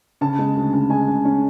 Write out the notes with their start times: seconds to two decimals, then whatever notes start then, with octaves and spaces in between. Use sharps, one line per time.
0.21 C#3 A5
0.38 G#3
0.56 D2
0.73 C#3
0.90 G#3 G#5
1.08 C#3
1.25 C#4